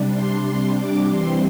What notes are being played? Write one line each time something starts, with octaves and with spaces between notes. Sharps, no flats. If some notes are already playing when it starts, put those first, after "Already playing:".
Already playing: C3 G3 D4
C6
C6
D6
E3 G3 C4 C6